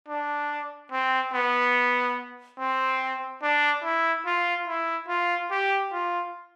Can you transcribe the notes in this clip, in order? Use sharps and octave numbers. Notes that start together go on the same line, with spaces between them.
D4
C4
B3
C4
D4
E4
F4
E4
F4
G4
F4